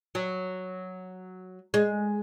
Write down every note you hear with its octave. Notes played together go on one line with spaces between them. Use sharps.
F#3
G#3